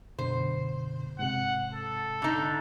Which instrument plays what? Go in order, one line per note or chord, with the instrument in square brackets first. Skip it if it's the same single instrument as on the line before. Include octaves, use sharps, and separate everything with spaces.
[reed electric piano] F#2 B2 D3 [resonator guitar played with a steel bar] C5
[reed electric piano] G#2 C3 [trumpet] F#5
[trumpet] A4
[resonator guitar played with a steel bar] D3 D#4